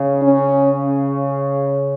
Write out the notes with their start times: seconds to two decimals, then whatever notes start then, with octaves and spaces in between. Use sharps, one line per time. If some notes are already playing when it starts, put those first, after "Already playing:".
Already playing: C#3
0.22 C#4